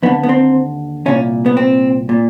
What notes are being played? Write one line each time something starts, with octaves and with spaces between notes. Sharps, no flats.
D#2 D3 B3
B3
C4
C2 A#2 C#4
B3
C4
A#2